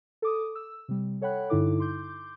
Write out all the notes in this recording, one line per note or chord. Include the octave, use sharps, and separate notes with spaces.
A4 D6 D#6
E6
C3 G3
A4 C#5 F#5 G5 B5 F#6
G2 D3 D#4 E4 A4 D6
C6 D6 G6